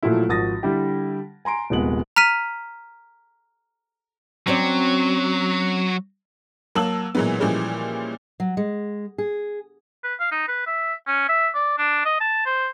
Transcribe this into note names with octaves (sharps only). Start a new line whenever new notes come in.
A#2 F3 F#3 A3 E4
G#1 F3 F#4 D#6 A6 A#6
D3 G3 E4 G4
G#5 A#5 C6 D7
D#1 C3 F3 G#3 B3 F#7
A#5 F6 B6 D#7
F#3 C4 C#4 D5
F#3 A#3 A5 E6 F#7
A#2 E3 F#3 G#3 B3
A#2 E3 F3 G3 G#3 C#4
F#3
G#3
G#4
B4
F5
D#4
B4
E5
C#4
E5
D5
D4
D#5
A5
C5